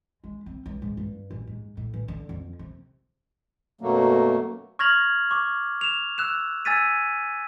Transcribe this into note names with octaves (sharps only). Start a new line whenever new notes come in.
G#3
C4
C#2
G#2
G2
A1
G#2
A2
E3
D3
F2
C3
F#2 B2 F#3 A3 A#3
C#6 F6 G#6 A#6 F7 F#7
C#6 D6
E7 F7
E6 F#6 E7
G#5 E6 G#6 A6 B6 D#7